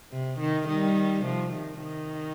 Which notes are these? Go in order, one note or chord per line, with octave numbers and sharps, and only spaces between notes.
C3
D#3
D#3 G3
C3 F3
D#3
D#3